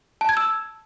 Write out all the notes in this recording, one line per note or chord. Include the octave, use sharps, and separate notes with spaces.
A5
G#6
E6